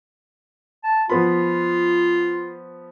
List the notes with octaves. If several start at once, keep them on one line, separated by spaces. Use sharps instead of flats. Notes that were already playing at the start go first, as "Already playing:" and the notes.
A5
F3 B3 F4 B5